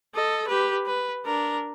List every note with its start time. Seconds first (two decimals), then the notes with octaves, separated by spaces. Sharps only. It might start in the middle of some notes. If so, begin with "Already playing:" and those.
0.15 A4 D#5
0.48 G4 B4
0.86 B4
1.25 D4 A#4